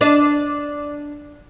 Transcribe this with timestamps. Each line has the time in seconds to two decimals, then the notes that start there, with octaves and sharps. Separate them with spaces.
0.01 D4 D#5